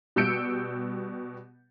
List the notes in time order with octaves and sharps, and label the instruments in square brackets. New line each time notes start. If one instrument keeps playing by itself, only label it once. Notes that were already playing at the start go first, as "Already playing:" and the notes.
[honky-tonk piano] B2 G3 E6 G6 C#7 D7